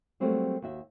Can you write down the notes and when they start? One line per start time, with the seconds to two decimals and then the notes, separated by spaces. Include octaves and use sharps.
0.20 F#3 G3 A3 A#3 C4 F#4
0.62 D#2 F#4 E5